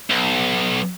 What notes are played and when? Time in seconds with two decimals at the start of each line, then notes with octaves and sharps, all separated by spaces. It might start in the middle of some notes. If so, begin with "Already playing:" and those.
0.10 B1